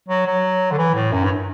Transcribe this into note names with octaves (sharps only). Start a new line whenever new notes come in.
F#3
F#3
D3
E3
A2
F#2
G2